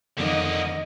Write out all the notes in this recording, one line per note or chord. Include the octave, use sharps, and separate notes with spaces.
F2 D3 D#3 A#3 D#5